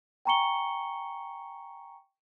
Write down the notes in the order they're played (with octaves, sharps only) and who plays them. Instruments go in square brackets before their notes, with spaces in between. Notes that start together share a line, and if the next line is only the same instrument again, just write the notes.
[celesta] G5 G#5 A#5 C#6 C#7 G7